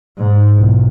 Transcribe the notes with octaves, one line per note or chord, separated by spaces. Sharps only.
G#2
B1